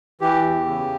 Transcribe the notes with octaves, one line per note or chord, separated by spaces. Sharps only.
E3 G4
E2
C#3